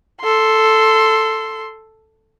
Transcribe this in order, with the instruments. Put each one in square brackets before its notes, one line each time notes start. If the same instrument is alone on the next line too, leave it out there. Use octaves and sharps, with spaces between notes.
[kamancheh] A4 C6